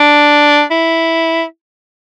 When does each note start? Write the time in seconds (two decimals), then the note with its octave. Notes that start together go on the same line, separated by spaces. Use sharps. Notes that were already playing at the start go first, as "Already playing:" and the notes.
Already playing: D4
0.71 E4